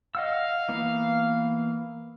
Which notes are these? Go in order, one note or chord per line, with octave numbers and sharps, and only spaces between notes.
D#5 F5 F#5 E6
E3 A#3 B3